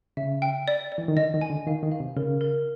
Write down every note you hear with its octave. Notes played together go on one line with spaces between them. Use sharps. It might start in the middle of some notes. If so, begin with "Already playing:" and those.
C#3 E5
G5
D5
D5
E3
D#3
D3 D#5
D#3
G#5
D3
D#3 F5
D#3
F5
C3
C#3 A#4
A#4